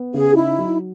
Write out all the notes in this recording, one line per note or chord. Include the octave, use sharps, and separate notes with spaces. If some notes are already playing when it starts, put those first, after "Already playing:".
Already playing: B3
C#3 G#4
D#4 E4
F#3